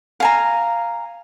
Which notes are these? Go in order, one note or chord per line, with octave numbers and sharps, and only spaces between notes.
F5 G#5 A#5